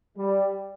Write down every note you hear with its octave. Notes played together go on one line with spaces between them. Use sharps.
G3